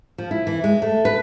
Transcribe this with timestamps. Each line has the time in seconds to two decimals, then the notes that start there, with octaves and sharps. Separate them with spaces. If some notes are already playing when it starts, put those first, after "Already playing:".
0.18 F3
0.31 E4
0.47 E3
0.64 G#3
0.82 A3
1.05 B4